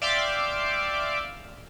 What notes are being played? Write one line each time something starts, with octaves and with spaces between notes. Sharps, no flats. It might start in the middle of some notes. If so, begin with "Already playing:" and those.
D5 E5 F5 G5 C6 D6